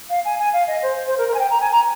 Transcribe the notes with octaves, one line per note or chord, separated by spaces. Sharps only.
F5
G#5
G#5
F5
D#5
C5
C5
A#4
A#4
G#5
G5
A#5
G#5
A#5